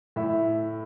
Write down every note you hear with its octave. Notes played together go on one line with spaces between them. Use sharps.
A2 E5